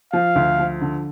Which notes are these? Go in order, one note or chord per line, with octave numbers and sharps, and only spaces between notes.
F3 F5
D2
F3
D3